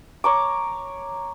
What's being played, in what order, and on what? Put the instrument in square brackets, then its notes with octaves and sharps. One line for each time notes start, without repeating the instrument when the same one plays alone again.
[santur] C#5 A#5 D6